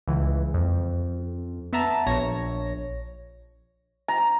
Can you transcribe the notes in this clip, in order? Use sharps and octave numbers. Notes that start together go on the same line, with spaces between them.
C#2 E3
F2
B3 E5 A5 A#5
A#1 C#5 A#6
A#5